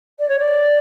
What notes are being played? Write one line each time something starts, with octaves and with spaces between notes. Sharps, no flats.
D5
C#5
D5